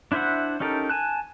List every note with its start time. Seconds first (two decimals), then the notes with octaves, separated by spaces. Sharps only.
0.12 D4 E4 C5 E5 F#5
0.60 C#4 D#4 G4 A4 A#4
0.89 G#5 A5 F#6